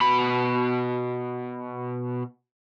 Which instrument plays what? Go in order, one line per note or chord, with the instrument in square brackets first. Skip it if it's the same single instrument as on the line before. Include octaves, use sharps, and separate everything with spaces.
[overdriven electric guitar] B2 B5